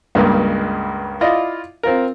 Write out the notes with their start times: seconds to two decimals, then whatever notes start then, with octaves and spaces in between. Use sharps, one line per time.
0.15 C#2 G2 C#3 A#3
1.21 E4 F4 D5 D#5
1.83 C4 F4 A#4